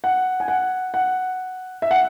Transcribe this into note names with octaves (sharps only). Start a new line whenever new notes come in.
F#5
G#5
F#5
F#5
E5
F#5